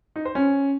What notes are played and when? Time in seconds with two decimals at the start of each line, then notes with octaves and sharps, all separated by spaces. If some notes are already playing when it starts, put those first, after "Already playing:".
0.16 D#4
0.25 C5
0.35 C#4